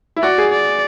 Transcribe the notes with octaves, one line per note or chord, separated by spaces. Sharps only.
E4
F#4 D5
G#4
D5